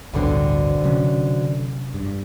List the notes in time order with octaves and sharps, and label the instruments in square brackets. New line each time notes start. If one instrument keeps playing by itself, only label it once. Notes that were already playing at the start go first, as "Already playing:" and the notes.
[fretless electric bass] A1 D2 G2 [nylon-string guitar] B2 D3 C4
[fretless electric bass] C3 F#3 C#4
G2